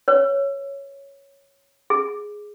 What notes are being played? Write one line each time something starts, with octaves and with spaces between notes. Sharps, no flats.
B4 C#5
G#4